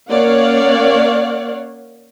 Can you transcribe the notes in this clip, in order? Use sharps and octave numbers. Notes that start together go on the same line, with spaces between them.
A#3 C#4 C#5 D5 F5 F#5